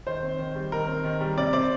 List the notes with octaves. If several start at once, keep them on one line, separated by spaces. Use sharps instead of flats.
D#3 C5
C4
D#3
G3
D#3 A#4
C4
D#3
G3
C3 D5
C4 D5